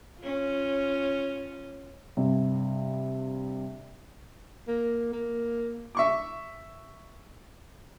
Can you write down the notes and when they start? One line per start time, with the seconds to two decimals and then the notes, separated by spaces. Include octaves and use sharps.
0.20 C#4 F4
2.17 G2 C3
4.67 A#3
5.13 A#3
5.95 E5 C#6 D6